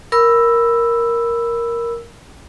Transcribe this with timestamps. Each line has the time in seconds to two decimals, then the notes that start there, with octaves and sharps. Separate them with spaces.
0.12 A#4 B5 E6